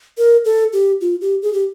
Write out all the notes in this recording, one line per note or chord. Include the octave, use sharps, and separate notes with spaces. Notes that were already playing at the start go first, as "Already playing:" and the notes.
A#4
A4
G4
F4
G4
G#4
G4